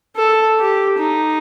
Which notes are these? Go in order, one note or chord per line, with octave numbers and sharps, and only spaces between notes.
A4
G4
D#4